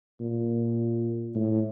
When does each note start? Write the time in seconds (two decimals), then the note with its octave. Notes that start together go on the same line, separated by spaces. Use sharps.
0.20 A#2
1.35 A2